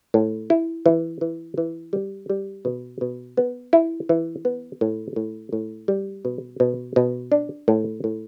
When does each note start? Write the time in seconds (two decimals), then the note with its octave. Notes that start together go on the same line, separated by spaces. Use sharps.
0.14 A2
0.50 E4
0.86 E3
1.21 E3
1.58 E3
1.93 G3
2.30 G3
2.65 B2
3.01 B2
3.37 B3
3.73 E4
4.09 E3
4.45 B3
4.81 A2
5.16 A2
5.53 A2
5.88 G3
6.25 B2
6.60 B2
6.96 B2
7.32 D4
7.68 A2
8.04 A2